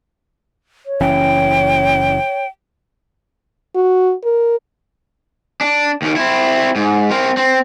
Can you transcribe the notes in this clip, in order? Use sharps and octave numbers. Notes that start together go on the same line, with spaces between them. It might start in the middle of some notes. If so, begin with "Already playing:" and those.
C#5
F#1 E3 C#4 G5
F#4
A#4
D4
D#2 D#3
C4 E4
G#2
C4 A#4
C4